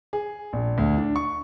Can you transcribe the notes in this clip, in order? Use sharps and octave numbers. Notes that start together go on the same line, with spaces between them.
G#4
A#1
D2
D4
C#6